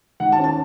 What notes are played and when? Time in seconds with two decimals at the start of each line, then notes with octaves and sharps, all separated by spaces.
0.20 D#3 F#5
0.32 A5
0.38 C#4
0.44 A5